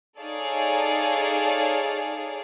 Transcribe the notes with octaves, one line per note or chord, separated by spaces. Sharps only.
D#4 G#4 A4 C#5 D5 F5